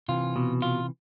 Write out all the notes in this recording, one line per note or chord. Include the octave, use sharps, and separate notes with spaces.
C3 E3 F4
B2
F4